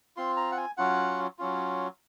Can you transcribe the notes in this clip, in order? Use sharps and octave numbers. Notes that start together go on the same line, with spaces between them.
C4 F4 C6
A#5
F#5
G#5
F#3 C#4 F4 F#5
F#3 C#4 F4